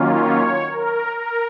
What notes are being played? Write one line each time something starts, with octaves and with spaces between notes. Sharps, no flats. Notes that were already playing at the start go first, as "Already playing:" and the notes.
Already playing: D#3 F#3 A#3 C#4 F4
C#5
A#4
A#4